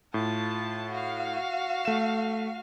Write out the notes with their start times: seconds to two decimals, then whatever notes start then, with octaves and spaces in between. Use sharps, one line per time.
0.14 A2 F4 A5
0.90 F#4 F5
1.85 A3 E7